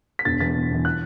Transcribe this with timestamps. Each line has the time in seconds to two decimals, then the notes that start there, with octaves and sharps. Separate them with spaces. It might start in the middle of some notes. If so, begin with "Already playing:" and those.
0.19 B6
0.25 E1 A6
0.40 E2 E3 A6
0.55 E1
0.71 E2 E3
0.85 F#6